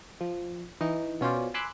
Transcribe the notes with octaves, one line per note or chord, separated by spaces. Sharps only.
F3
E3 D#4
B2 C#4 F4 C5 D5
G#5 B5 C6 D6 E6 F#6